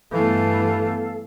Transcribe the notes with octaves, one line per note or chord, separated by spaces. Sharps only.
G2 E3 A3 B3 A4 F5